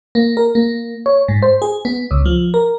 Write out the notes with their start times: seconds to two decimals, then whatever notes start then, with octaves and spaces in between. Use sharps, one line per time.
0.15 A#3
0.37 A#4
0.55 A#3
1.06 C#5
1.28 G#2
1.42 C5
1.62 G#4
1.85 B3
2.11 C#2
2.26 F3
2.54 A#4